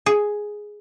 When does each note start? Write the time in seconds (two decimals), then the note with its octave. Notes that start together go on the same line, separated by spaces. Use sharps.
0.06 G#4